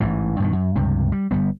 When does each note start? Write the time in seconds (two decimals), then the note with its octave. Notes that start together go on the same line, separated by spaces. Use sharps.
0.01 A1 G#2 E3
0.40 G2 B2 D#3
0.53 F#2
0.76 C#2 G2 C3
1.12 G3
1.31 G1 G3 B3